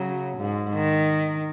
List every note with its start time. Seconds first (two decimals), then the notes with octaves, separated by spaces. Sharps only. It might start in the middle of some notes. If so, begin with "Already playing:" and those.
Already playing: C#3 F#3
0.38 G#2
0.74 D#3